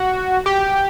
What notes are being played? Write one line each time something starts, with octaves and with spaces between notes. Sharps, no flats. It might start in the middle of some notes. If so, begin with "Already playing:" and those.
Already playing: F#4
G4